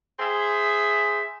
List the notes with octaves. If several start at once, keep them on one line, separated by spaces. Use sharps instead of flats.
G#4 C5 E5